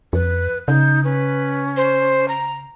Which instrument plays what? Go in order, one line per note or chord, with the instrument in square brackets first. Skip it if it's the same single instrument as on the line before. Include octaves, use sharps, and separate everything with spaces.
[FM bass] F2 [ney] B4
[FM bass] C#3 [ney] D#4 [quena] G6
[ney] C#4 [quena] B4
[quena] C5
A#5